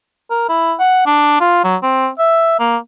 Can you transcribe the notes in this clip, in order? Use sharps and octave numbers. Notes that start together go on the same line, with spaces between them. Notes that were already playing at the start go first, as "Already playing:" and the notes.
A#4
E4
F#5
D4
F4
F#3
C4
E5
A#3